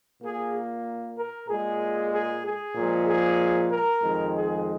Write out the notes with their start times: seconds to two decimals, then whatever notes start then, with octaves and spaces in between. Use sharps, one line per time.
0.21 A#2 A#3 G#4
1.17 A#4
1.48 A#2 G#3 G#4
2.12 G#4
2.43 G#4
2.75 A#2 F3 G#3
3.07 G#4
3.70 A#4
4.02 F2 D#3 G#3
4.34 G#4